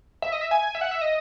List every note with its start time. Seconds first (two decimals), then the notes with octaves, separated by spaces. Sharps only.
0.22 E5
0.32 D#5
0.41 E5
0.51 G#5
0.75 E5
0.81 F#5
0.91 E5
1.01 D#5